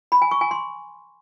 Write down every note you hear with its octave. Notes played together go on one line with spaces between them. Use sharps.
B5
G#5
C#6
G#5
C6